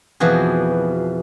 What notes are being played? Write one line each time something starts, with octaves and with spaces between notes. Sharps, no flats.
F2 B2 E3 F3 F#4 G#4